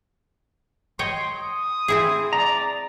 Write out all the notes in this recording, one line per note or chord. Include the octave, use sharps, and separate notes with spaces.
C#5 D#5 G5 C6
D#6
C4 E4 G#4
D5 A#5